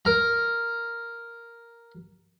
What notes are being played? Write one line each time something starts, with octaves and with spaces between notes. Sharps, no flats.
A#4 A#5